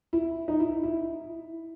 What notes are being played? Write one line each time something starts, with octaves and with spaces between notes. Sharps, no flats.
E4
D#4
E4
E4